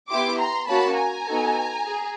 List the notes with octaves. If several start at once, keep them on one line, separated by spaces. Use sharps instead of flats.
B3 E4 G4 C6 D6
A#5 C6
A#3 C#4 F#4 A5 B5
G#5 A#5
B3 D#4 F#4 A4
G#4